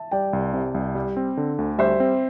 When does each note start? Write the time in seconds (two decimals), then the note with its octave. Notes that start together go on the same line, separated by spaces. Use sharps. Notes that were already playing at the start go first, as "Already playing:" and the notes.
Already playing: E5 A5
0.12 G3 D5 G5
0.33 C2
0.54 C3
0.74 C2
0.95 G3
1.17 C4
1.37 D3
1.58 D2
1.78 G3 C5 E5
2.00 C4